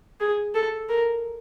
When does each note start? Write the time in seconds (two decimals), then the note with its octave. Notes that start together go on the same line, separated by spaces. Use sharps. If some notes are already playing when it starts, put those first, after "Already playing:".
0.20 G#4
0.54 A4
0.89 A#4